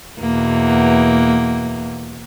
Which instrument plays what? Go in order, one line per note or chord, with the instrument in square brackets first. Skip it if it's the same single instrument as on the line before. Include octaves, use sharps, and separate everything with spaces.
[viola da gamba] E2 B2 A#3